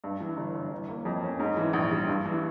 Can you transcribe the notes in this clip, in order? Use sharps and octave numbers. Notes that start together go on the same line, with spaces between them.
G2
E3
G1
G1
E3
A#3
F2
C#4
G#2
E3
A#1
G3
G2
E3